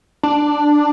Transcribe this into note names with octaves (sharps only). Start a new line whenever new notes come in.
D4